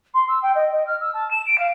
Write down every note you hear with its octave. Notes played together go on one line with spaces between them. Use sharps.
C6
E6
G5
D#5
D#5
F6
E6
A5
E7
D7
F5